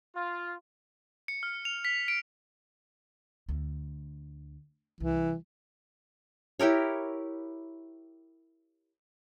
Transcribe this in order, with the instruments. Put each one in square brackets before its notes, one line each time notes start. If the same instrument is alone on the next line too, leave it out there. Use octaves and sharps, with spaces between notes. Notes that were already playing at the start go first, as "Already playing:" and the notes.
[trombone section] F4
[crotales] C#7
F6
F7
B6
D7
[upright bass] D2
[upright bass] C2 [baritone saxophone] E3
[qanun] E4 G4 A#4 C#5